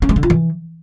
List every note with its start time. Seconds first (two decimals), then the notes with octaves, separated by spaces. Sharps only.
0.02 C#4
0.09 G#3
0.16 D3
0.23 F4
0.30 E3